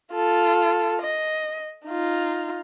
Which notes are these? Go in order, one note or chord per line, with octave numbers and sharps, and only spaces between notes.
F4 A4
D#5
D#4 F4